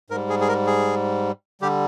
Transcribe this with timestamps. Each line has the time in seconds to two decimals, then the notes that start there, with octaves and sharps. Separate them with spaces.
0.10 G#2 A#4
0.14 G3
0.30 G#4
0.41 G#4
0.48 A#4
0.67 G#4
1.61 D3 G3 G4